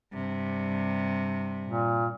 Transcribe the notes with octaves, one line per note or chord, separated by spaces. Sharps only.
G2 C3
A#2